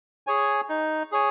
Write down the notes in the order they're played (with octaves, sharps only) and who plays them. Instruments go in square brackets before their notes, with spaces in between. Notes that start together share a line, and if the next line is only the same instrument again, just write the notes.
[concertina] G#4 C#5 G#5
D#4
G#4 C#5 G#5